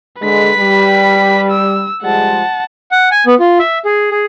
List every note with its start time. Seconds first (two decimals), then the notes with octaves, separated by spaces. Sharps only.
0.22 D3 G#3 B4 B6
0.58 G3
1.51 E6
2.03 F3 G3 G#3 F#5 A5
2.91 F#5
3.11 G#5
3.26 B3
3.40 F4
3.59 E5
3.85 G#4
4.11 G#4